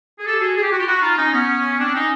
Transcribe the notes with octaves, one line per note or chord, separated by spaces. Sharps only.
G#4
G4 A4
F#4 G#4
G#4
G4
F#4
F4 G4
E4 F#4
D#4 F4
C#4 D#4
B3 C#4
C4 D4
C#4 D#4